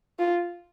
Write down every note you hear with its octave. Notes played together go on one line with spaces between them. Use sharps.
F4